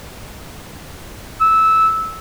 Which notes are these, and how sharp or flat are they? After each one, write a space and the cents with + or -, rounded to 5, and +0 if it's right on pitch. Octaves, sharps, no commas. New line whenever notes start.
E6 -15